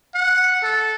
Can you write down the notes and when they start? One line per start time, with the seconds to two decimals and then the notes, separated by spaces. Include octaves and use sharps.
0.15 F#5
0.63 A4